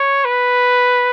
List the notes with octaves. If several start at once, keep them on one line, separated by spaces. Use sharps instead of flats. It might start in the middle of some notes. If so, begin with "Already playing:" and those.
Already playing: C#5
B4